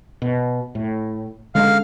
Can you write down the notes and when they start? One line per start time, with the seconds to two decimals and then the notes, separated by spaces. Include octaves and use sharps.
0.22 B2
0.75 A2
1.55 D3 G#3 C#4 F5